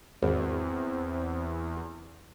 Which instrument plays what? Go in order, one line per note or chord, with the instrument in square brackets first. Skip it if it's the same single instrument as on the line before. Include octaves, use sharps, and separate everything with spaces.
[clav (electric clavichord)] G#1 [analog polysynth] E2 [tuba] C4